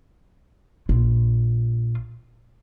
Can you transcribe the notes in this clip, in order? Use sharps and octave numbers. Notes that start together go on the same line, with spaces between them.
A#1 F4